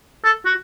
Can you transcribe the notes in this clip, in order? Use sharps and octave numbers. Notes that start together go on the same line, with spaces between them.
A4
F#4